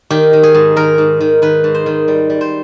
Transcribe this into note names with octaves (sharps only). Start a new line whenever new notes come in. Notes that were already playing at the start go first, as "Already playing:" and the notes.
D#3 G4
D#3
G#4
G#2
D#3 A#4
G#2
D#3
D#3 B4
G#2
C5
D#3
G3
G3
C5